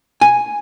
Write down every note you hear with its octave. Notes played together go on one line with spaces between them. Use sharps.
G#5